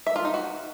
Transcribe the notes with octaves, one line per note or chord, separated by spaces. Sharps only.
E5
F4
D#4
F#4